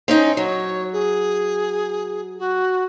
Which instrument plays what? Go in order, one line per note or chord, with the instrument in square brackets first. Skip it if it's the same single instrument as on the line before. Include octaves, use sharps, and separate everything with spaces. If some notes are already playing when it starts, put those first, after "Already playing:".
[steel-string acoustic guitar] C4 C#4 D#4
[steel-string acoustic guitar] F#3 [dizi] C#5
[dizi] G#4
F#4